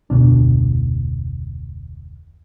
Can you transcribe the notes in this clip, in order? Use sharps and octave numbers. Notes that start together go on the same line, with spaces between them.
F1 D2 B2 D4